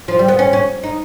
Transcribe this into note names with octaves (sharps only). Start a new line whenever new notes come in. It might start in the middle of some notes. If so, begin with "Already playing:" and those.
F3
G3
B3
C#4
C#4
D#4